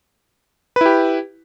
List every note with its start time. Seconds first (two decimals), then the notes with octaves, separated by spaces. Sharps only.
0.76 B4
0.81 E4
0.86 G4